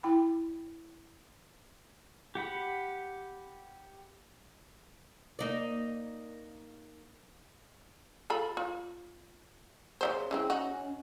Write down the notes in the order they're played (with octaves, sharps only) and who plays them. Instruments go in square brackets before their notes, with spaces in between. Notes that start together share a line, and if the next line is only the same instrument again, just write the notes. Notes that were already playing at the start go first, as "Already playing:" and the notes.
[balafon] E4 G5 B5
[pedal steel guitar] G4 F#5 B5
[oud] A#3 D#4 D5
[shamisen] F4 A4 B5
F4
C#3 G3 C5
[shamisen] E3 G#3 C4 [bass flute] C#4
[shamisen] D#4 F#4